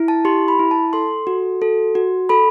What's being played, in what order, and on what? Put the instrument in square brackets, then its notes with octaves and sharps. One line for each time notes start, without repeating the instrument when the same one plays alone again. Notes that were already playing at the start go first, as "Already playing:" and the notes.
Already playing: [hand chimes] E4
A5
G4 C6
B5
E4
A5
A4 C6
F#4
A4
F#4
A4 B5